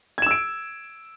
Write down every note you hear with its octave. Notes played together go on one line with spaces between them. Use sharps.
E6 G#6 D7 E7